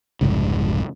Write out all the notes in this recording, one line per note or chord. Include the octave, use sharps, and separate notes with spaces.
F1 C2 G#2 C#3